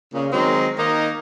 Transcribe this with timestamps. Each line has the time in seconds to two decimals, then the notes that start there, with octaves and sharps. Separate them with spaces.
0.14 A#2 C#3
0.33 D#3 F#3 G#3 C4
0.79 D#3 A#3 D#4